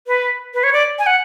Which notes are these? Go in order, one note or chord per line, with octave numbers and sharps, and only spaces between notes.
B4
B4
C#5
D5
G#5
F#5